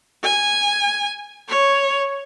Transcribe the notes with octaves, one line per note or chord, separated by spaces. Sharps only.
G#5
C#5